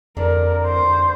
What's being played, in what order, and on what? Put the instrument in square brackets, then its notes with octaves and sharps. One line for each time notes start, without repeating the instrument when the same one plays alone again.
[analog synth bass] F2 [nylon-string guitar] D3 [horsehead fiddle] A#4
[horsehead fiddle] C5